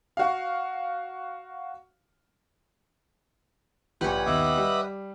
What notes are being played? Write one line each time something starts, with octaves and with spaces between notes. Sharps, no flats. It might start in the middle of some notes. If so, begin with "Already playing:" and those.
F#4 F5
A#1 A#2 G4 B4 C#5 F#5
D#2 B2 D#5 E5 D6
G3